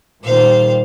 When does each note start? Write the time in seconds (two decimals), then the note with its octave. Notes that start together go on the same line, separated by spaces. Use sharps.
0.24 A#2 D#3 G3 C5 F5